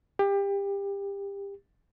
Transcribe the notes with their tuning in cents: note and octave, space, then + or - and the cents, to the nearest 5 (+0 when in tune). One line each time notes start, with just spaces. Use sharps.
G4 +25